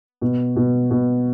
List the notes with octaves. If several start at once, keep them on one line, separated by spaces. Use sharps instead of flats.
B2
B2
B2